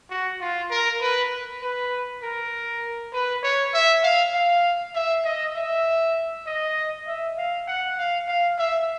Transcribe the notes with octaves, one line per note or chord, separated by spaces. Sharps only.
F#4
F4
A#4
B4
B4
A#4
B4
C#5
E5
F5
F5
E5
D#5
E5
D#5
E5
F5
F#5
F5
F5
E5